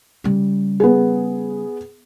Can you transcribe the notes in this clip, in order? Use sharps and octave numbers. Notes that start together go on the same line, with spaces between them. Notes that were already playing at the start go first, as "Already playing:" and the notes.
C#3 G3
B3 G#4